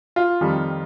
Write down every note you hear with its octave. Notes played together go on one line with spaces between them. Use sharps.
F4
F2 D#3 G3